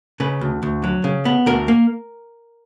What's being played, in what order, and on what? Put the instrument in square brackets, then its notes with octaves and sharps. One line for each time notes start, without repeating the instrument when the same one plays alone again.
[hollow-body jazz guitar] C#3 B4
D2
D2
F#3
C#3
B3
D2 A#4
A#3